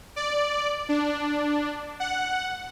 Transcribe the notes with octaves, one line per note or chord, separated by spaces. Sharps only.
D5
D4
F#5